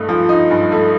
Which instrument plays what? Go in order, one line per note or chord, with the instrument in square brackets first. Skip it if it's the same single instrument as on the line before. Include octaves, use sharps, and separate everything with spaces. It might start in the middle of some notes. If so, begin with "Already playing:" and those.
Already playing: [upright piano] G2 A3 D#4
F3
D#4
G2
A3